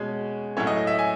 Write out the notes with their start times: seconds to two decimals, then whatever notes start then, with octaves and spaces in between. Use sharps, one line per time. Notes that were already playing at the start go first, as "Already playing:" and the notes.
Already playing: B2 G#3 C#4
0.57 A2 F#3 A3 C#4 C#5
0.67 D#5
0.77 D#5
0.87 E5
0.99 G#5